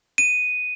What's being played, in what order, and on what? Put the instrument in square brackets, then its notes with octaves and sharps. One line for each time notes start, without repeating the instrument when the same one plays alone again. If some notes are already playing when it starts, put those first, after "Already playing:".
[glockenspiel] D#7